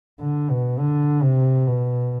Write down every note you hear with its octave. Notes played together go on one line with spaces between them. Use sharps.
D3
B2
D3
C3
B2